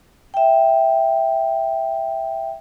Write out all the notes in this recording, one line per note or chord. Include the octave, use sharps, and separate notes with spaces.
E5 G5